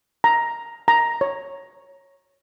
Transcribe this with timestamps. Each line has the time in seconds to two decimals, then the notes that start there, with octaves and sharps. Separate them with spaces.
0.24 A#5
0.88 A#5
1.21 C#5